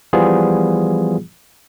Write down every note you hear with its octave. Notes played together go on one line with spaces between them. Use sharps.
E3 F3 G3 B3 F4 G#4